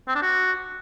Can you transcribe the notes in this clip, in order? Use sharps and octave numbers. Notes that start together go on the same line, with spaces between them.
C4
D4
F#4